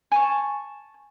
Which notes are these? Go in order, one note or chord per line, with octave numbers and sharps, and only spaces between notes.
G#5 A5 C#6